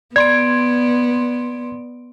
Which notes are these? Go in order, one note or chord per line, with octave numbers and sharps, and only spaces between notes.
B3 D5 C6 G#6 D7